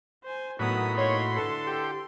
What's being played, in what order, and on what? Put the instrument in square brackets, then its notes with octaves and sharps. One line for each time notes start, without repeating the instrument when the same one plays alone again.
[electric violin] C5 G#5
[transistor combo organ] A2 F#4 B5 [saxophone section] D#3 F#3 [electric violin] B3 D#6
[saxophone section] A#3 D#4 C#5 [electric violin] C6
[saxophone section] D3 E3 A4
[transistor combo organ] G4